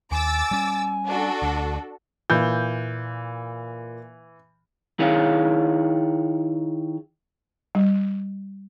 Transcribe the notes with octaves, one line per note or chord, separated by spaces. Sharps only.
D#2 G#5 D6 E6 A6
G3 C#4
D4 F#4 A4
D2
A#2 E3 G6
D#3 E4 G#4 C#5 F5
G3